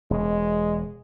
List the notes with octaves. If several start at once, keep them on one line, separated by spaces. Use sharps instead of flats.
E1 B2 G#3